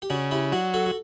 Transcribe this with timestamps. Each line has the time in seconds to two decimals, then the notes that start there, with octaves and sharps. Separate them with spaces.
0.02 G4
0.10 C#3 D4 F#4
0.31 E4 G4
0.52 F#3 D4 F#4
0.74 F#4 A4
0.86 F#4